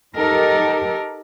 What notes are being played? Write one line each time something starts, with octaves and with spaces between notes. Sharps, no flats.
D#4 G4 A4 A#4